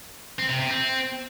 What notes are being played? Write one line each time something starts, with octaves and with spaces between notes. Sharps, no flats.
C4
C3
C3
C4